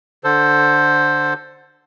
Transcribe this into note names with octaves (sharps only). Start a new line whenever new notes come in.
D3 A4 C5